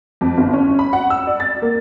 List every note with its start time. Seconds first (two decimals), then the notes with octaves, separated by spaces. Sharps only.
0.21 F2
0.37 G1
0.53 C#4
0.79 B5
0.93 F#5
1.10 E6
1.27 D5
1.40 A6
1.62 A#3